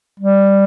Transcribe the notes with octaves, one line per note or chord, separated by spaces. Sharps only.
G3